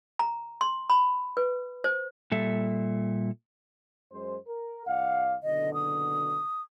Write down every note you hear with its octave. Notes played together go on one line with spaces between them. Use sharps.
A#5
C6
B5
B4
C5
A#2 G3 A4 E5
F#2 G#3 C5
A#4
C2 D5 F5 F#5
F#1 B2 D3 D#5
D#6